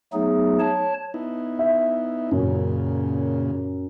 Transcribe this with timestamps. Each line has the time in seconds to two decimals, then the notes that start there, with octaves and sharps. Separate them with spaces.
0.13 F#3 A3 B3 D#4 G#4
0.60 C#5 A5
1.14 B3 D#4 E4
1.59 E5
2.31 F#2 A#2 C#3